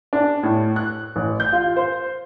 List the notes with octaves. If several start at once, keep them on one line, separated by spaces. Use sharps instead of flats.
D4
A2
F#6
A1
G6
F4
C5